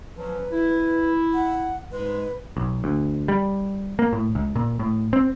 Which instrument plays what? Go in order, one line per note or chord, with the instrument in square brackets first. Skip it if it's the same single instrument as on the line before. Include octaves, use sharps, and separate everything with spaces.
[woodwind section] F3 F#3 C#4 [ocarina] B4
[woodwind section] E4
[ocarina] F#5
[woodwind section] G#2 G#3 [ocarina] B4
[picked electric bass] B1
D2
G3
A#3
A2
C#2
A#2
A2
C4